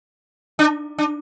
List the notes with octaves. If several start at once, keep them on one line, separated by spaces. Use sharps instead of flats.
D4
D4